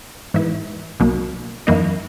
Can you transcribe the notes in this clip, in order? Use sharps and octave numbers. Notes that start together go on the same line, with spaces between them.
G#2 E3 B3 E4
B1 B2 F#3 A#3
F#2 E3 A#3 D#4